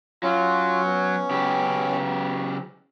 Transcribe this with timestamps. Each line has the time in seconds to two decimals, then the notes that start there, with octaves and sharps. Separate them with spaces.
0.23 F#3 C#4 F4
0.85 B3
1.31 C#3 F#3 G4